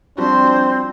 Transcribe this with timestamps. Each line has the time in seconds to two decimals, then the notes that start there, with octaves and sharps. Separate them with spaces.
0.18 F3 G3 C4 D4 F#4 C5